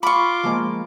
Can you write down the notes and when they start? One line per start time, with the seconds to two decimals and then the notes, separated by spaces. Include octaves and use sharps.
0.03 F4 B5 C#6 D6
0.43 F3 G#3 A#3